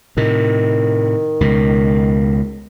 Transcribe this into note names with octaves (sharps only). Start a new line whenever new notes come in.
A2 C3 D#3
C#2 B2